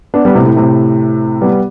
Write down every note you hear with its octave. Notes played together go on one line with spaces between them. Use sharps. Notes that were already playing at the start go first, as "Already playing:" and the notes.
B3 D4
G3 B3
A2 C3
A2
A2 C3
G3 B3